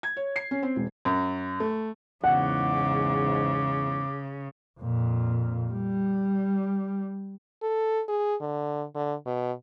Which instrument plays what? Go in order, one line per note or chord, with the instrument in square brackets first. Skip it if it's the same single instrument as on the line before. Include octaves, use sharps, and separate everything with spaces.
[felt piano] G#6
C#5
C7
C#4
C4
E1
[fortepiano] F#2
A3
[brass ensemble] E2 G#2 [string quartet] C#3 [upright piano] F#5 [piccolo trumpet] D6
[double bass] F2 A#2
G3
[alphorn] A4
G#4
D3
D3
B2